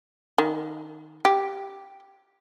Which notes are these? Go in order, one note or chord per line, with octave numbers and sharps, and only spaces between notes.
D#3
G4